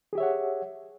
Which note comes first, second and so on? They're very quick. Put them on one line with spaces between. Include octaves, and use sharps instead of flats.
G#4 G4 E5 C#5 F#5